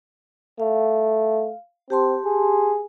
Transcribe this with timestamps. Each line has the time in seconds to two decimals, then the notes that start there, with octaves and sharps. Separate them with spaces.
0.60 A3 F5
1.90 C4 G4 A5 C6
2.25 G#4